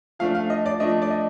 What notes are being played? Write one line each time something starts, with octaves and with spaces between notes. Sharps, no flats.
F3 A3 D4 F5
F5
D#5
D5
F3 A3 D4 D#5
D5
D#5